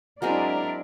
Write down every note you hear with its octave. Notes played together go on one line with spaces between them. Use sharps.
F#3 G#3 C4 D4 E4 A#4 D5